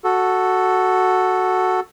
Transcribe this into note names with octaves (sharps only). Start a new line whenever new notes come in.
F#4 A4